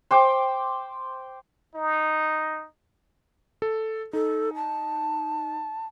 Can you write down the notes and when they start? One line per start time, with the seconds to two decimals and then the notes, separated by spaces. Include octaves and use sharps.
0.11 C5 G5 D6
1.75 D#4
3.62 A4
4.13 D#4 A4
4.55 A5